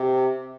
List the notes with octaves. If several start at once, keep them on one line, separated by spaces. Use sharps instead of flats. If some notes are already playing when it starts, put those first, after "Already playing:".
Already playing: C3